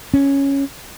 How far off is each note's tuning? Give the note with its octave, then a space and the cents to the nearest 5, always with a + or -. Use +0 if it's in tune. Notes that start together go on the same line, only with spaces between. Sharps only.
C#4 +0